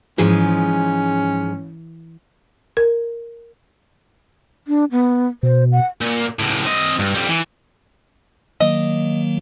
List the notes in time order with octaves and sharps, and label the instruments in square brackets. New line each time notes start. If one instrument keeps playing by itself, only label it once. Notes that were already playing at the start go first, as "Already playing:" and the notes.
[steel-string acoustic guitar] G#2 F3 G#3 [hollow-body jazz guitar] E3 G#4 [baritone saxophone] C#4
[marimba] A#4
[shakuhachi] D4
B3
[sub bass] B2 [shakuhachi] C5
[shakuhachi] F#5
[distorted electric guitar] A#2
C#2 A2
C4 D#5
G2
F2 G3
E3
[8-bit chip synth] D#3 F#3 A#3 [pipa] D#5